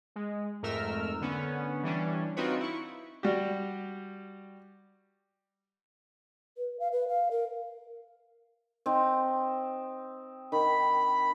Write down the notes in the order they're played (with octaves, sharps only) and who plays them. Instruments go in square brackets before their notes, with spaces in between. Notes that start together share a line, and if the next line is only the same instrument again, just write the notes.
[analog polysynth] G#3
F2 G#2 A3 A#4 E6 F6
D3 B3 C#4
E3 G3 C#4 D4
C4 D#4 F4 F#4 B4 C#5
E4 C#6
[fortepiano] G3 F#4 G4
[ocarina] B4
F5
B4
F5
A#4
[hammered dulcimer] C4 D#4
[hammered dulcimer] D#3 [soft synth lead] B5